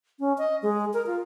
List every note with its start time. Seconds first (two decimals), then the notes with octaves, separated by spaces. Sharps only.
0.20 C#4
0.38 D#5
0.63 G#3
0.94 A#4
1.07 F4